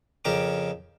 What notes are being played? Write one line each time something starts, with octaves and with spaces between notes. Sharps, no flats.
F2 C#3 A#4 G5 D6